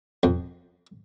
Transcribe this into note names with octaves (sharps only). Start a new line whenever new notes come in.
F2